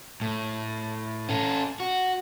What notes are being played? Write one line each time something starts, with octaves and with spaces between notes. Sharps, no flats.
A2
C#4 A4
F#4